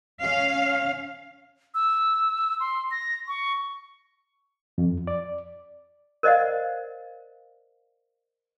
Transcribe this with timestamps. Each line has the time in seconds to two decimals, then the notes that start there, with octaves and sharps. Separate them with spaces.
0.22 C#4 F5
1.74 E6
2.60 C6
2.91 A#6
3.28 C#6
4.78 F2
5.07 D5
6.23 A#4 C5 D5 D#5 F5 F#5